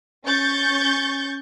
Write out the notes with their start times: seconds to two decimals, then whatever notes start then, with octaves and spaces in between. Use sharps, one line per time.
0.25 C#4 C#6 G6 A6